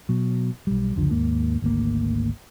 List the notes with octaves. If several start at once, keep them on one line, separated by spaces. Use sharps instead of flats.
B2 F#3
B1 G3
F#1 C#2 D3 F3
D#2 G#2 A#3
G#1 D2 A#3